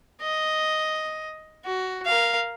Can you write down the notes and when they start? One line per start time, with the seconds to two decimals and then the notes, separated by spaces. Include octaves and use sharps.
0.22 D#5
1.65 F#4
2.06 A#4 F5